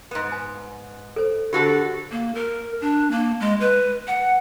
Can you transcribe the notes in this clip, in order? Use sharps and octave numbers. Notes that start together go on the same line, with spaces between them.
G#2 B3
G#5
A4 C5
D3 F#4 G4 A4 A#4 F#5
A#3
A#4
D4
A#3
G#3
B4
F#5